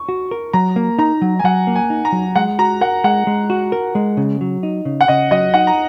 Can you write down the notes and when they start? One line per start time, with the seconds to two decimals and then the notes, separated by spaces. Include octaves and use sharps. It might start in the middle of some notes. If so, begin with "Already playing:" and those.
Already playing: C#6
0.09 F#4
0.31 A#4
0.53 F#3 A#5
0.76 A#3
0.99 D#4 A#5
1.22 F#3
1.39 G#5
1.44 F#3 F#5
1.67 A#3
1.76 G#5
1.90 D#4
2.05 A#5
2.12 F#3
2.36 G#3 F#5
2.59 F#4 A#5
2.81 A#4 F#5
3.04 G#3 F#5
3.27 G#3
3.50 F#4
3.72 A#4
3.95 G#3
4.17 C#3
4.41 F#3
4.63 D#4
4.85 C#3
5.01 F#5
5.08 C#3 D#5
5.31 F#3 D#5
5.54 D#4 F#5
5.67 A#5